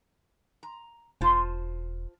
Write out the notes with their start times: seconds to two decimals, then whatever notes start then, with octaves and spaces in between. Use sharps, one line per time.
0.63 A#5
1.21 E1 F4 C5 A5